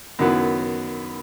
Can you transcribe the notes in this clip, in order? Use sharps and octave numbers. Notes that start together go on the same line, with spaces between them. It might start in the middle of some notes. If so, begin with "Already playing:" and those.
F#2 D#3 F#3 B3 E4